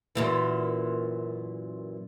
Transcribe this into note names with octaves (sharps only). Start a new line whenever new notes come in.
F#2 A#2 E3